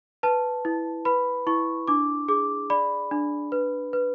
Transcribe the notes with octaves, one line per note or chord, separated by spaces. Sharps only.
B4 A5
E4
B4 B5
E4 C#6
D4 D6
G#4 D6
D5 B5
D4
B4
B4